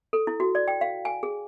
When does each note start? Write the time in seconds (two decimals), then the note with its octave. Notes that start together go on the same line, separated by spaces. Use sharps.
0.13 A4
0.27 E4
0.40 F#4
0.55 D5
0.68 G5
0.81 F5
1.05 G#5
1.23 G#4